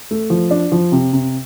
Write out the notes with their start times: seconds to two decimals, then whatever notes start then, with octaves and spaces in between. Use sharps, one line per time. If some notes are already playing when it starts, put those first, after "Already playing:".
0.11 A3
0.30 F3
0.51 D4
0.72 F3
0.92 C3
1.13 C3